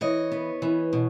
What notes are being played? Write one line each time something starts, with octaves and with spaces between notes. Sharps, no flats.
E3 C#5 D#5
B3
E3
B2